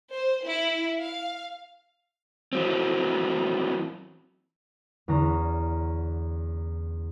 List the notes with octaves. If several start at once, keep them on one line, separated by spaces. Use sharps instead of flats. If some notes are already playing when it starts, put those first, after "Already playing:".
C5
E4
F5
E3 F#3 C4
E2 D3 C#4 A#5